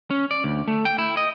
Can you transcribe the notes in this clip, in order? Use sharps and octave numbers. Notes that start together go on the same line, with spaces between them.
C#4
D5
D2
A3
G5
E4
D#5